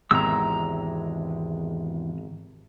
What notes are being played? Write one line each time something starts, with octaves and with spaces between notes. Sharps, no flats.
G#1 E2 C3 G#3 A#5 E6